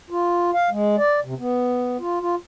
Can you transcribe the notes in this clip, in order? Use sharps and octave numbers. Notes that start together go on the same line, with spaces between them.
F4
F5
G#3
D5
C3
B3
F4
F4